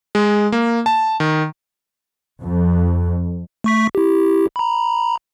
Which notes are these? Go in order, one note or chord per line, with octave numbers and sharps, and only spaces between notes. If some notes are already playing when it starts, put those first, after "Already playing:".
G#3
A#3
A5
D#3
F2
A3 C#6 B6
E4 G4
A#5 B5